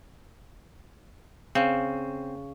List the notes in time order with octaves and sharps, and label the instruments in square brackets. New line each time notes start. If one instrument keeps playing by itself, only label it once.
[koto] C#3 [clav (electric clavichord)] C4